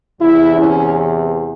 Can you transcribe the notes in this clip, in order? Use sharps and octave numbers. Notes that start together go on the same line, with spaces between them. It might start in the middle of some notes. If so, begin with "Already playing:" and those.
E2 C3 E3 E4
C#4